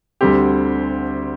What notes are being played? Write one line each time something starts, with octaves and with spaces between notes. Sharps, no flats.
D2 D3 G3 C4 G4